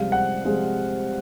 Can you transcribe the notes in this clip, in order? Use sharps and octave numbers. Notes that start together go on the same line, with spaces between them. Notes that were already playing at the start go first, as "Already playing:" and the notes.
Already playing: C2 C3 F3 G#3 C4 F5
F#5
C3 F3 G#3 C4